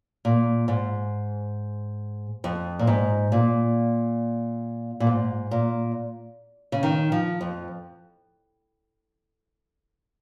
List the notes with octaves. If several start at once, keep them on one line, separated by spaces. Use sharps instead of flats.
A#2
G#2
F2
A#2
G#2
A#2
A#2
G#2
A#2
C#3
D#3
F3
F2